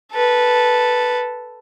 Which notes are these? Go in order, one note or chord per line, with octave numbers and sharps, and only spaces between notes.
A4 B4